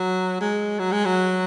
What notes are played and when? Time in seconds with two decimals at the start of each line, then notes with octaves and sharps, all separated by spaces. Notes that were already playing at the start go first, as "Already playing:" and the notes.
Already playing: F#3
0.41 G#3
0.79 F#3
0.92 G#3
1.05 F#3